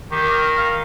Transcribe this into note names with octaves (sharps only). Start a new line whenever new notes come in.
D#3 G4
A#4
F5